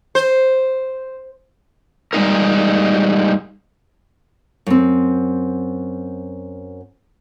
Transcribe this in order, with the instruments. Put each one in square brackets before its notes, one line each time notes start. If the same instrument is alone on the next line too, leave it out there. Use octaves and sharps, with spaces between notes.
[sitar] C5
[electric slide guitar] G3 G#3 D#4 A#4
[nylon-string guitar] F#2 C4